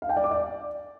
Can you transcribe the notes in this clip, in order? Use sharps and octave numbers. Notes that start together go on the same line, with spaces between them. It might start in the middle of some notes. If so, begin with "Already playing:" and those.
F5
G5
D5
D6
D5